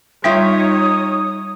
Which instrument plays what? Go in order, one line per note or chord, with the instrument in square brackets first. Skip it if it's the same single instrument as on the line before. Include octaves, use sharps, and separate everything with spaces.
[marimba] G3 [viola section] D#4 C#5 [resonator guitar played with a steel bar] F4 E5 G5 [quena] D#6